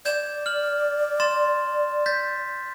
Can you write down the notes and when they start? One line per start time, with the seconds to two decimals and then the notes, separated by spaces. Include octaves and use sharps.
0.05 D5 G6 G#6 E7
0.46 F6 F#7
1.20 C6 A6 E7
2.06 G6 A6 B6